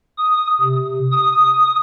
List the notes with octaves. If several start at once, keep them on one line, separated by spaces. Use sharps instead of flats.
D#6
C3
D#6